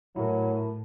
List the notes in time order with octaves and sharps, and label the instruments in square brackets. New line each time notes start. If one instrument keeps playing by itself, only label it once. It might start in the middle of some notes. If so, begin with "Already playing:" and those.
[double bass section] A2 [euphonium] F#3 [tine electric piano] E4 A#4